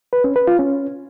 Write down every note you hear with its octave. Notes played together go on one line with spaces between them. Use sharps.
B4
C#4
B4
F4
C#4